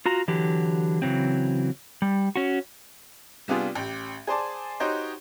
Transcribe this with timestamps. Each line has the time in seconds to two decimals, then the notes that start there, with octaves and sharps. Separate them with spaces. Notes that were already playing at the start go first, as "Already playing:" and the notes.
0.06 F4 F#4 A#5
0.28 D3 E3 F#3 G4
1.02 C#3 E3 F#3 C4
2.02 G3
2.36 C#4 F#4
3.48 C3 G3 B3 D4 F4 G#4
3.75 A1 G4
4.27 G#4 C5 D5 A5
4.80 D#4 F#4 G4 C5 C#5 D#5